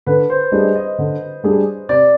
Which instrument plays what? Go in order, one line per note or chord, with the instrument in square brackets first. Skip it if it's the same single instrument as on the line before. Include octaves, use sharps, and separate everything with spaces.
[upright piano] D3 [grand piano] B4
[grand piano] C5
[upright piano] G3 D4 G#4 [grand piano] D#5
[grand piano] D#5
[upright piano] D3
G3 D4 G#4
[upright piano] C3 [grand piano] D5